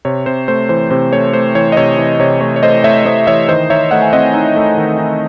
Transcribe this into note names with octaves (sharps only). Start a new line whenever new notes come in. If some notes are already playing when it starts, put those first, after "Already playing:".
C3 C#5
C3 C5
A3 C5
E3 C5
C3 C5
A3 C#5
A3 C5
E3 C#5
D#5
C3 C#5
E3
C3 C#5
A3 C#5
C#5
A3 C5 D#5
A3 C#5 E5
A3 C5 D#5
E3 C#5 E5
D#3 C5 D#5
D#4 C#5 E5
A3 D#5 F#5
G#5
C4 D#5 F#5
D#4
A3
D#3
D#4